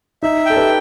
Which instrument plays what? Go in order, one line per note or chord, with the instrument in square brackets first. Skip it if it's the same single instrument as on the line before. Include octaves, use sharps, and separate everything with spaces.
[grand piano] D#4 [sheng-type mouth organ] E5
[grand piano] A4 [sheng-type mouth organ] G5
[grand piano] G4 B4